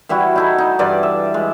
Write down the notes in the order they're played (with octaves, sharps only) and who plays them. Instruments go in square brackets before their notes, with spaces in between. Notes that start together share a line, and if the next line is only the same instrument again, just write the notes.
[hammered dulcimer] E3 G3 E4 F#4
D#4 E4 A4
D#4
G2 E3 D5 G#5
E5
G#3